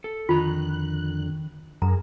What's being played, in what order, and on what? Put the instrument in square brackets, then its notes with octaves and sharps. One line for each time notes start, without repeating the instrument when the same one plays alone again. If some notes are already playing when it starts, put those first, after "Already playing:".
[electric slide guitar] A4
[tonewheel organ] F2 D3 F#6 [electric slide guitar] D#3 A#5 [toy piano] F4
[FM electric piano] F#2 [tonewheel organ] G#4 A#4 [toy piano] A#5